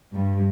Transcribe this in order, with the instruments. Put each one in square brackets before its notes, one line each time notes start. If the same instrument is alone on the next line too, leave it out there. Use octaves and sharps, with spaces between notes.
[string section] G2